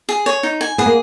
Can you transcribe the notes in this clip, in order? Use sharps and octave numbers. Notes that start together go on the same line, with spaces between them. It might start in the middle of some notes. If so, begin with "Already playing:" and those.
G#4
C#5
D#4
G#5
B3 G#4
A#3